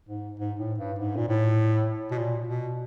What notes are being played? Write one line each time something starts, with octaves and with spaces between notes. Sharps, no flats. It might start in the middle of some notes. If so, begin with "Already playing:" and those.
G#2
G#2
A2
G2
G#2
A#2
A2
B2
A#2
B2